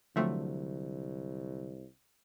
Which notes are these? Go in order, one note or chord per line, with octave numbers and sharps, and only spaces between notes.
C2 D3 F3 F#3 A3 C4